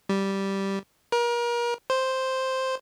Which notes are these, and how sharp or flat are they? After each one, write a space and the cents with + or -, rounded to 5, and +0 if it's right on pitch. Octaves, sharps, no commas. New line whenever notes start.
G3 -5
A#4 +35
C5 +0